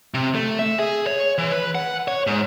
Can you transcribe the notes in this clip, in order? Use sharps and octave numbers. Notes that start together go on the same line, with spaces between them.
C3
A3
E5
G#4
C#5
E3
B4
F#5
C#5
G#2